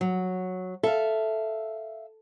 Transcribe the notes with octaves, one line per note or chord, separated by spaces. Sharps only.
F#3
A4 E5 F5